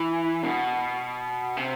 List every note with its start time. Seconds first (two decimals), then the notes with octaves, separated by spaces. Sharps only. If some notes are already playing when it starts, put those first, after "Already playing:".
Already playing: E3
0.44 B2
1.57 C3